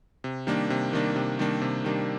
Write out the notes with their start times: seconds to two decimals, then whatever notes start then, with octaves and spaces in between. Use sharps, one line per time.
0.24 C3
0.47 D#3 G3 A#3 D4
0.70 C3
0.93 D#3 G3 A#3 D4
1.16 C3
1.39 D#3 G3 A#3 D4
1.62 C3
1.84 D#3 G3 A#3 D4